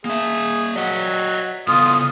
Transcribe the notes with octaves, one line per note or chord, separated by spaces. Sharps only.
A#3 G#4 E5
F#3 D5 D#5 F#5
C#3 B3 F4 A4 D#6